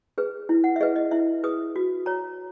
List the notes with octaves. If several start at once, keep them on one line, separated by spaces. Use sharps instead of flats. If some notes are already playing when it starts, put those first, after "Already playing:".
G#4 B4
E4
F#5
E5
G#4 B4 D#5
D#5
E4 E5
G#4 B4 D#6
F#4
C#5 A#5